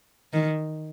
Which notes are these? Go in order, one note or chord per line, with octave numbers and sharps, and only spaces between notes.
D#3